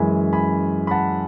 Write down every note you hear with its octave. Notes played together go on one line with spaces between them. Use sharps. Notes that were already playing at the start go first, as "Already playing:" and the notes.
Already playing: F#2 E3 G#3 G#5 B5
G#5 B5
B5
F#5 A5